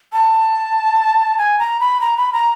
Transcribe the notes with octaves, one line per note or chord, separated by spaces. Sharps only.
A5
G#5
A#5
B5
A#5
B5
A#5